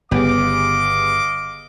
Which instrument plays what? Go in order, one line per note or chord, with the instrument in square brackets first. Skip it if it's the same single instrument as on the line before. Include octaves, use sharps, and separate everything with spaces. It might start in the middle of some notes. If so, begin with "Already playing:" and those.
[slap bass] G1 C#3 [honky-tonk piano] B3 G4 G#4 [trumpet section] D#5 F5 D6